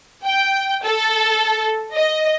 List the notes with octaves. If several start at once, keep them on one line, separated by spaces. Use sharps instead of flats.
G5
A4
D#5